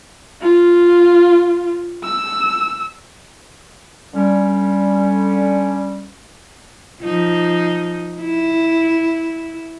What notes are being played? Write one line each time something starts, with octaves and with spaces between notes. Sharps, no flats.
F4
E6
D3 G3 C#4
F3 D#4
E4